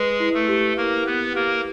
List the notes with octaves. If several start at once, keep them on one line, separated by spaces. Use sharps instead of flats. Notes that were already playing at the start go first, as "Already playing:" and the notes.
Already playing: G#3 G#4 B4
E4
A3 A4
G4
A#3 E4 A#4
B3 G4 B4
A#3 G4 A#4